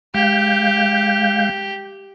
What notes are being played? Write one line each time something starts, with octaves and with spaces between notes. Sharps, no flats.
G#3 G4 F5 G6